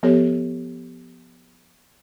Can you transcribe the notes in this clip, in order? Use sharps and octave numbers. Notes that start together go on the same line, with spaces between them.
F3 B3 G4 A4 C#5